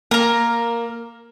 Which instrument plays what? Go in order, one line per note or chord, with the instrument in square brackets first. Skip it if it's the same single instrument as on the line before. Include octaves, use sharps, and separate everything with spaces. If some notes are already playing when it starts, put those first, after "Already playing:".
[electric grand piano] A#3 [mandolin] A#4 A#5